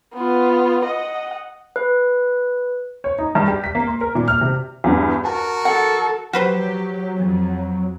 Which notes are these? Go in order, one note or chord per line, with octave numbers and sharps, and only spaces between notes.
B3 F4
D#5 F#5
B4
C#5
D#4
G2
G4
B6
A#3
C6
A#4
A#2
F6
C3
E2 G2
F#4 A#4 A5
A4 F#5
F3 F#3 F#4 G4 B4 C5
F2